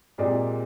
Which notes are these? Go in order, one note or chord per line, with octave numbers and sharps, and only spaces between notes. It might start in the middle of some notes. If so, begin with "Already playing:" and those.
A#2 G#3 C4 G4 D5